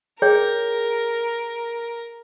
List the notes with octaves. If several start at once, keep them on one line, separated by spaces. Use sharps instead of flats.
G#4 A#4 C#5 G5